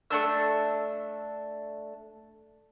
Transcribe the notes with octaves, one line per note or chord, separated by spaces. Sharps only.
A3 A#3 D4 E6